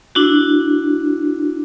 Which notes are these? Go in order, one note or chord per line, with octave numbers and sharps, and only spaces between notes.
D4 E4 F#4